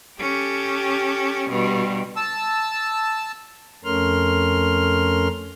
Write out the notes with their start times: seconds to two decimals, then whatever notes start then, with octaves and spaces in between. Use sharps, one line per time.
0.19 C#4 G4 A4
1.48 G2 B2 G3
2.16 A5 E6
3.85 F2 A3 C#4 A#4 C6 F6